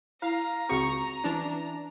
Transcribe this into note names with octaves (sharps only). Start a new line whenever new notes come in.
E4 F5 A#5
C#2 C4 F#4 G#4 C#6
E3 C#4 D4